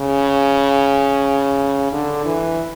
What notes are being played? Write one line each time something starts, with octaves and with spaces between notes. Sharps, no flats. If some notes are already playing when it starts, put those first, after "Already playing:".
Already playing: C#3
D3
E3